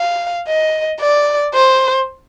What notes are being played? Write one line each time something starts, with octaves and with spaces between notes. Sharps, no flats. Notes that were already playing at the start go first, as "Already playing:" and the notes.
Already playing: F5
D#5
D5
C5